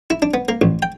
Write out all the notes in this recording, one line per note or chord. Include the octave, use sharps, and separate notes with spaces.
E4
D4
B3
A#3
A1
G5